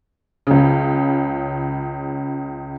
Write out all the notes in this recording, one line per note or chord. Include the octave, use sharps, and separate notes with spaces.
C#2 C#3